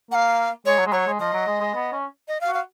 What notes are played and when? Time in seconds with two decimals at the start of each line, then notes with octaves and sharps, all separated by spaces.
0.11 A#3 F#5
0.15 F5
0.66 G#3 C#5
0.79 F#3
0.86 G#3
0.92 F#3 C#5
1.07 G#3
1.20 F3 D#5
1.33 F#3
1.47 G#3
1.61 G#3
1.75 B3
1.92 C#4
2.28 D#5
2.41 F5
2.47 F#4
2.54 F5